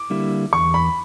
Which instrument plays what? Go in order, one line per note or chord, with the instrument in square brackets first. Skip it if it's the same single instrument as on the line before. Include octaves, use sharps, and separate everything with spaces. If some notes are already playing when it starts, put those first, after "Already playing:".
Already playing: [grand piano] D6
[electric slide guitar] D3 G3 A#3 E4
[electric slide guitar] E2 [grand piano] C#6
[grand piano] B5